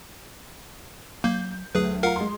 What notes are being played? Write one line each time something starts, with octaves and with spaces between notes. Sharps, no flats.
F#3 A#3 G6
D2 F#3 G#4 B4
F4 A#4 F5 F#5 A#5
G#3 C6